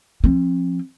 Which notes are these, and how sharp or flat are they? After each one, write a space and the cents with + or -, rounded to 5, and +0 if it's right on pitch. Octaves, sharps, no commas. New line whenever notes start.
F3 +0 C4 +40